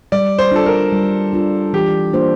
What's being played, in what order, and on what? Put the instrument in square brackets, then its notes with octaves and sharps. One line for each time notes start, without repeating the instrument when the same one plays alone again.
[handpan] G3 [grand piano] D5
[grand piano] C5
[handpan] D4 F4 [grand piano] A4
[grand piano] A#4
[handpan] G3
D4 F4
[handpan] E3 [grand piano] G4
[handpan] A#3 D4 F4 C5